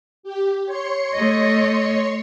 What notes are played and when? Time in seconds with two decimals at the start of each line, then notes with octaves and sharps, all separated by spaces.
0.23 G4
0.65 C#5 C6 C#7
1.15 A3 D#5